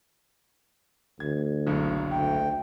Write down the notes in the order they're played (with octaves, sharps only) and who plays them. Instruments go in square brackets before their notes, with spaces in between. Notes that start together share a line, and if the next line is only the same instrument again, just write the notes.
[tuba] D2 [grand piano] G#6
[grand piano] F#1 B1 D3
[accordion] D2 G5